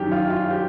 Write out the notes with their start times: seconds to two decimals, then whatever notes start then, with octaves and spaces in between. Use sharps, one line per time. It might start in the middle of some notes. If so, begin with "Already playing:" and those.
Already playing: F#2 D#3 G4
0.12 F4
0.30 F4
0.51 G4